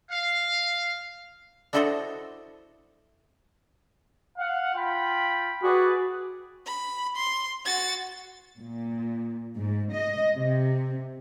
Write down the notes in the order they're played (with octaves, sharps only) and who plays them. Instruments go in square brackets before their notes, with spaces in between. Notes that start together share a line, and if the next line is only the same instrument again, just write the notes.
[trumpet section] F5
[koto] D4 E4 F#4 A4 C5 D#5
[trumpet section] F5 F#5
F4 G5 B5
[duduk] F#4 [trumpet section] G#4 B4 D5
[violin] B5
C6
F#4 A6
[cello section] A#2
G#2
D#5
C3